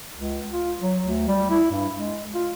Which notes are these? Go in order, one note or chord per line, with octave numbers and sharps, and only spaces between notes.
C#2
F4
F#3
D2
G3
E4
G2
G#3
F4